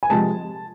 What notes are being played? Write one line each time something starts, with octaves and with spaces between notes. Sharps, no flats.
G#5
C3 F3 G#3 A5